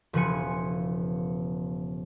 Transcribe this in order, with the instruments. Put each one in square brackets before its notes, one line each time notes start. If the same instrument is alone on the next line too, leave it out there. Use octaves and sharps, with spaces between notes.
[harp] E1 C#3 F3 B4 G#5 C#7